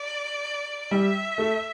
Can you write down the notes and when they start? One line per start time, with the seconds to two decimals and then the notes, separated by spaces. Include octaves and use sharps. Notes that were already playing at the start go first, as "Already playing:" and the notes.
Already playing: D5
0.91 G3 E5
1.38 A3